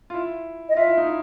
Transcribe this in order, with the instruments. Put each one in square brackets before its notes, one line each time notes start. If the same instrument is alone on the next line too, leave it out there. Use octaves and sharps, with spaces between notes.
[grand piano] F4
E4
[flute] D#5
[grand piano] F4 [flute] E5
[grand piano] E4
D#4
E4